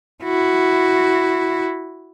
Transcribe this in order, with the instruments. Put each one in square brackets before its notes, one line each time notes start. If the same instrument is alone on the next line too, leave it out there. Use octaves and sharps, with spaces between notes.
[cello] E4 F#4